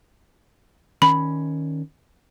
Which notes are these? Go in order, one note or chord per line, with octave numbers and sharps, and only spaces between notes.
D#3 C#4 B5